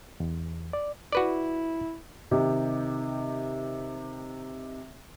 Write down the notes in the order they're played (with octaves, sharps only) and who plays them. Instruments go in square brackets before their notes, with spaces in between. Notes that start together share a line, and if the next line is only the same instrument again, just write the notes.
[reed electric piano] E2
D5
[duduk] E4 [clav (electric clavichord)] F#4 B4 D5
[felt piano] C3 D#3 D#4 G4